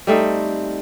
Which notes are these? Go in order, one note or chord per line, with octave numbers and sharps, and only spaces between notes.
G3 A3 C4 D#4